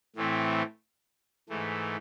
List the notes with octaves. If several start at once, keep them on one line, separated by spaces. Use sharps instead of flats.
A2 E3 A3 C4
G#2 E3 A3